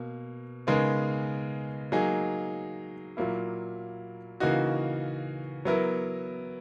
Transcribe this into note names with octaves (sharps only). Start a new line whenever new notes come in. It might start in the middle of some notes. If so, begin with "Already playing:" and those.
Already playing: B2 A#3
C#3 G#3 B3 D#4 A#4
F#3 A#3 D#4 G#4
A#2 F#3 A#3 E4
C#3 E3 A#3 D#4 F#4
F#3 B3 E4 A#4